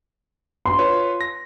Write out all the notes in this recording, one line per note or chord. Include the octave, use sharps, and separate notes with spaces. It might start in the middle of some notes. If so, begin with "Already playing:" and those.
C6
F4 B4 C#5
A#6